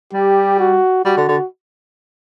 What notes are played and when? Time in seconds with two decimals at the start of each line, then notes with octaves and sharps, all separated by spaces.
0.13 G3 G4
0.59 F#4
1.05 G3 F#4
1.17 D3
1.29 D3